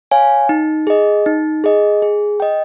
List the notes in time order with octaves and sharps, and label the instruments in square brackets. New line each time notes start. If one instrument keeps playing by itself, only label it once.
[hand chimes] C#5 F5 G#5
D#4
G#4 D#5
D#4
G#4 D#5
G#4
D#5 G5